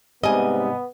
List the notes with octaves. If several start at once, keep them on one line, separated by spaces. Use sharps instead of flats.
G#2 C3 G3 B3 D#5 G#5